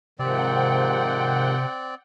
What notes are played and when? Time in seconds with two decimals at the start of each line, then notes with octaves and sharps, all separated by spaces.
0.19 G#2 C3 D#3 F3 C4 D5 F#5 G5